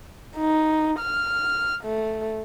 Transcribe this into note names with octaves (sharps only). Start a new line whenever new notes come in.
D#4
F6
A3